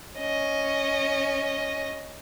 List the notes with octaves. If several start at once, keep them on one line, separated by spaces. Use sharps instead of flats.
C#4 D#5